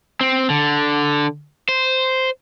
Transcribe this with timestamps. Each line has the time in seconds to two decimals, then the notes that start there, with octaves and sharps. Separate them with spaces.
0.21 C4
0.50 D3
1.69 C5